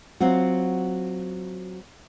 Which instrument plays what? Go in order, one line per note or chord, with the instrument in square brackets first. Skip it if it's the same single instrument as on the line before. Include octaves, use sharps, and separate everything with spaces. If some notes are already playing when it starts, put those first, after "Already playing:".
[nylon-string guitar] F#3 C4 F4 F#4